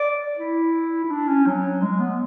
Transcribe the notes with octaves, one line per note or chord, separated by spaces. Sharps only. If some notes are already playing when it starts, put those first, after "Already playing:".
Already playing: D5
E4
E4
D4
C#4
F#3
G#3
B3